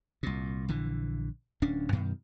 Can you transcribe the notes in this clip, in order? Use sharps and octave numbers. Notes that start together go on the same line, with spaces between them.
C2 A#2
A#1 D3 E3
D1 C#4 D4
F#2 B2 D#3